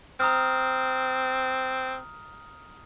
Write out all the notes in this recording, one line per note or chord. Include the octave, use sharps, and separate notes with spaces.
C4 A#5 D#6 F6